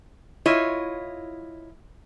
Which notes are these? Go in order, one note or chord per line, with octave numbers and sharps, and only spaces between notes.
E4 F4 C#5 D#5